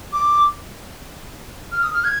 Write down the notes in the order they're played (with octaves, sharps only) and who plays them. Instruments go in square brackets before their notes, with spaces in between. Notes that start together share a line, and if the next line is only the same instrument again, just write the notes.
[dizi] D6
F6
D#6
F6
G#6